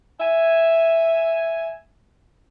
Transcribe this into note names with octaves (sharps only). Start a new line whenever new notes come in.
E5 G#5